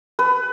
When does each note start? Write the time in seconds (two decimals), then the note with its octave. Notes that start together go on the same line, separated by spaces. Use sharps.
0.19 B4